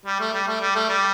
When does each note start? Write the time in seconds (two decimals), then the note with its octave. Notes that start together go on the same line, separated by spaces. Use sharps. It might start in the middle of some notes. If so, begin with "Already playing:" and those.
0.06 G3
0.20 A3
0.34 G3
0.47 A3
0.61 G3
0.75 A3
0.89 G3